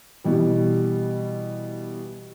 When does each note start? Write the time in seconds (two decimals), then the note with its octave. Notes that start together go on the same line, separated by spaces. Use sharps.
0.24 B2 E3 G3